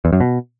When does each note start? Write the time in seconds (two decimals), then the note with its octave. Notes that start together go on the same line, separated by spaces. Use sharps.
0.05 E2
0.13 F#2
0.21 B2